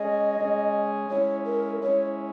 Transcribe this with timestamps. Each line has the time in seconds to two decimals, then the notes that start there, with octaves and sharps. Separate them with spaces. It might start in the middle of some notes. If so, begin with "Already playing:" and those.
Already playing: G#3 C#4 G#4 D#5
0.40 G#3 C#4 G#4
1.10 G#3 C#4 E4 C#5
1.46 A#4
1.83 G#3 C#4 E4 C#5